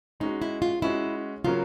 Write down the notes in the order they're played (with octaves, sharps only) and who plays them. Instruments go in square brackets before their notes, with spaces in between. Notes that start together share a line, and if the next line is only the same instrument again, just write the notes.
[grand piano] G#3 C#4 F#4 [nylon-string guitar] D#4
[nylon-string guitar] E4
F4
[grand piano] G#3 C#4 F#4 [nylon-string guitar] E4
[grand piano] C#3 F#3 A#3 C#4 [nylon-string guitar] F4